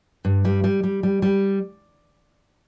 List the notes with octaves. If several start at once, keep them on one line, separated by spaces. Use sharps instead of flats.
G2
G3
G3
G3
G3
G3